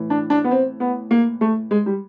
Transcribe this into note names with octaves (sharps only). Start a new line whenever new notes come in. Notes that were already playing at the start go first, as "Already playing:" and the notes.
Already playing: A2 E3
D4
D4
B3
C4
B3
A#3
A3
G#3
G3